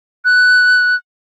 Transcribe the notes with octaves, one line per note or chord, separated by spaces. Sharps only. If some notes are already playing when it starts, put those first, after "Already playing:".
F#6